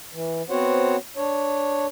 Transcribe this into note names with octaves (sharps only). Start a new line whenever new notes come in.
E3
B3 C4 F#4 C5 C#5 F#5
D4 C#5